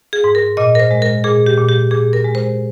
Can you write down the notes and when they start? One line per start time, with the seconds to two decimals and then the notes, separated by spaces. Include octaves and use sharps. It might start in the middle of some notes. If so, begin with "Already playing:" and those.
0.13 G#4
0.24 G#2
0.35 A#4
0.57 A#2 D#5
0.75 A#4
0.80 C5
0.91 G#3
1.02 A#4
1.24 A#2 G#4
1.46 G4
1.57 A#2
1.69 G4
1.91 A#2 G#4
2.13 A#4
2.24 G#3
2.35 C5